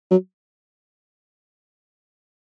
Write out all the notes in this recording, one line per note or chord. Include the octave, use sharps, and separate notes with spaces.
F#3